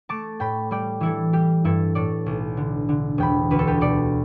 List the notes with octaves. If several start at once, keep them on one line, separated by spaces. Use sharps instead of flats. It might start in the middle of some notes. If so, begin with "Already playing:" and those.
A3 A5 D6
A2 G5 B5
G3 D5 G5
E3 E4 A4
G3 G4
G2 E4 A4
A2 A4 D5
B1
D3
D3
E1 G5 B5
D2 B4
A4
G4 B4
B2 A4 D5